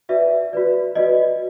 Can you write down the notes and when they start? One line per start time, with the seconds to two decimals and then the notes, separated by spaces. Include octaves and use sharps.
0.09 F#4 B4 D5 E5
0.53 F#4 B4 D5
0.95 F#4 B4 D5 D#5